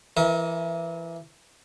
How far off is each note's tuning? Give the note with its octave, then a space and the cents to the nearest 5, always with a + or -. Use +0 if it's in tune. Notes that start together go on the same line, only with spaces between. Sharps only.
E3 +25 A#4 +20 E5 -35